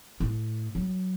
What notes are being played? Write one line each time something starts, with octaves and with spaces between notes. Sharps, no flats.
A2
F#3